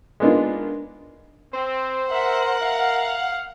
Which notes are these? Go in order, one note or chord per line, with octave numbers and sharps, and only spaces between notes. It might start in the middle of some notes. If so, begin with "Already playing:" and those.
G#3 A#3 B3 D4 D#4 F4
C4 C5
A#4 E5 F#5
E5 F5